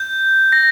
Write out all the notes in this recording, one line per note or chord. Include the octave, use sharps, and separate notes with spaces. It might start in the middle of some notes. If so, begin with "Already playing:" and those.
Already playing: G6
A#6